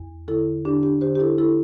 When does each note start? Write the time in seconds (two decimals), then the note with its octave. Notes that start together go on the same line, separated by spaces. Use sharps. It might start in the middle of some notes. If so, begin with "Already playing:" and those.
Already playing: E2
0.28 D3 E4 A4
0.65 D3 D4 G4
0.83 D4 G4
1.01 D3 G4 C5
1.15 G4
1.20 E4 A4
1.38 D3 E4 A4